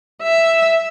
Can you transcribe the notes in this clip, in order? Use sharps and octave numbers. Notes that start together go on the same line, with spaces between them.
E5